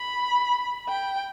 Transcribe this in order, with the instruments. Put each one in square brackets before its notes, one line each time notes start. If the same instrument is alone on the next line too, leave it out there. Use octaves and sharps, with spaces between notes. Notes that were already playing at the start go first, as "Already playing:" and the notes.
Already playing: [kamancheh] B5
G5